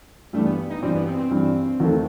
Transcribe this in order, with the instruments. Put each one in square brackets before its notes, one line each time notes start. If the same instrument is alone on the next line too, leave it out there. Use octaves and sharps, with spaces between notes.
[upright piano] G2 E3 G3 [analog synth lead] A3
[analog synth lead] B3
D#4
[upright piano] G2 E3 G3 [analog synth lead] C4
[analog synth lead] B3
C4
C4
[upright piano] G2 E3 G3
D#2 D#3 A3